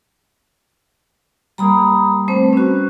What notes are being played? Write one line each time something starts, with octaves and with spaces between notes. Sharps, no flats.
G3 A#3 A#5 B5 D#6
A3 C4 B4 C5
C#4 F#4